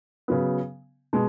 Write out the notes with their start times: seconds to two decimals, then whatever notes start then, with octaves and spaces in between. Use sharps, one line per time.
0.28 C#3 F#3 B3
1.13 B2 G#3